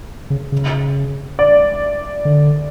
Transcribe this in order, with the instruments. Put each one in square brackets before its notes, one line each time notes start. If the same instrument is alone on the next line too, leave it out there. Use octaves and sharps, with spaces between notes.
[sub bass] C#3
C#3
[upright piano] D5
[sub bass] D3